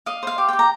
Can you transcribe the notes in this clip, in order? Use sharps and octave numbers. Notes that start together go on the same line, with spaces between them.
D#5 F5
C5 F5
G4
G4 G5
A#5